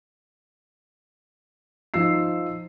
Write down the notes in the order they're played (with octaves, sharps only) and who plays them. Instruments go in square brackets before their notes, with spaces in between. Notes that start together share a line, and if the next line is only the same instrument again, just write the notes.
[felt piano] F3 D#4 F4 E6 C7